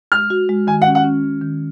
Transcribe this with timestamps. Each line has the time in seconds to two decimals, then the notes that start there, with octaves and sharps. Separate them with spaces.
0.12 G#3 F6
0.30 F#4
0.49 G#3
0.67 D#3 G#5
0.82 F#5
0.87 C#4
0.95 F#5
1.04 C#4
1.24 D#3
1.41 D#3